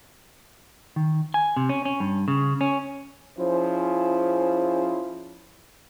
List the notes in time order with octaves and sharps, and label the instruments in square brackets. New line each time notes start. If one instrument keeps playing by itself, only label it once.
[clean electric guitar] D#3
G#5
C3
C#4
C#4
G2
C#3
C#4
[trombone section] F3 C#4 E4 G#4 C5